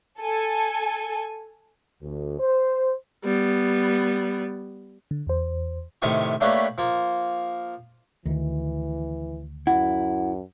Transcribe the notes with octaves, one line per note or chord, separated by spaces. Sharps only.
A4 G#5
D2
C5
G3 B3
D3
E2 C5
A2 C3 D#3 G#5 C#6
A3 A#3 C#4 D4 G4 B4
F3 A#3
D2 D#3 E3
F#2 E4 F#5